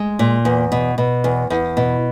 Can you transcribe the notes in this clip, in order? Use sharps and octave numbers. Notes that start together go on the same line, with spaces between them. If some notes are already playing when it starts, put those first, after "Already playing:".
Already playing: G#3
A#2
E2
B2
B2
E2
E2
B2